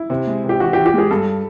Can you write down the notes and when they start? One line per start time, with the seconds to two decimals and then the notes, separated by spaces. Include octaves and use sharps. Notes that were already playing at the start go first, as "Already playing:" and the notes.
Already playing: E4
0.10 C3
0.27 G#3
0.44 C3
0.49 G4
0.60 E3 F#4
0.73 G4
0.77 E3
0.86 G4
0.94 G#3 G#4
1.11 G2 A4